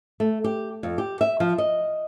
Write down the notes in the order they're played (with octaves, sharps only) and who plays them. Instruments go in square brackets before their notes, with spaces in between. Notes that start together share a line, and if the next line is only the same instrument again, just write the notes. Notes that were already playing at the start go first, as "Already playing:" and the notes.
[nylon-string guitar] A3
G4
F2
G4
E5
F3
D#5